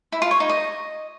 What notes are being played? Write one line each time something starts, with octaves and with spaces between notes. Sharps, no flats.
E4
F4
C#5
D#4
D#5